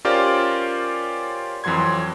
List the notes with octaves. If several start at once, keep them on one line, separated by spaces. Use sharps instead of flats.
C#4 F4 G4 A#4 C5 D5
F2 E3 F#3 C6 G#6